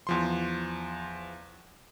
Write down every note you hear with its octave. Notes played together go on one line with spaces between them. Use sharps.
E2 F3 C6